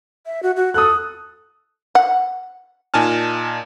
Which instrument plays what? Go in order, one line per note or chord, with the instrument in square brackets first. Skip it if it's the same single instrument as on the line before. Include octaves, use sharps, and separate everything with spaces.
[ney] E5
F#4
F#4
[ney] A4 [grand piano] D#6 F#6
[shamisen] F#5
[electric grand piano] A#2 D#4 G#5 A5 F6